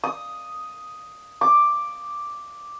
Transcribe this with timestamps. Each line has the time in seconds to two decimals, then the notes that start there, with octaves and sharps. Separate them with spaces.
0.04 D#6
1.41 D6